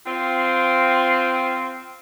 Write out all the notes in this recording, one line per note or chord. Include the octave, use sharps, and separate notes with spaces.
C4 F4